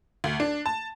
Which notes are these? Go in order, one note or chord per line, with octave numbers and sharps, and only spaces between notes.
D2
D4
A5